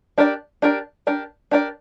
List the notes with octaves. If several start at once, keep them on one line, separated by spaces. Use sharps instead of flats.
D4 G4 A#4 D5
D4 G4 A#4 D5
D4 G4 A#4 D5
D4 G4 A#4 D5